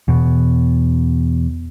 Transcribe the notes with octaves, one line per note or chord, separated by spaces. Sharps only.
E2 B2